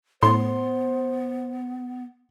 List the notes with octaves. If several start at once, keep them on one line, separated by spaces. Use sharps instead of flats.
A2 B3 C5 C6